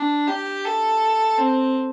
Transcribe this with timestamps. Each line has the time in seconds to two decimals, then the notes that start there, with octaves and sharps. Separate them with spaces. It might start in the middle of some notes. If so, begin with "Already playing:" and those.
Already playing: D4
0.28 G4
0.65 A4
1.38 C4